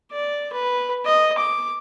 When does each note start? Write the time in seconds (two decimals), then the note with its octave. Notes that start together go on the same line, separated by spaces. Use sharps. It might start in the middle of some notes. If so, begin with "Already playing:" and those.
0.12 D5
0.53 B4
1.06 D#5
1.38 D6